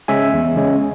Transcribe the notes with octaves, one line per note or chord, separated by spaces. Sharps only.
C#3 G#3 C#4 E5 G#5
E2
C#3 G#3 C#4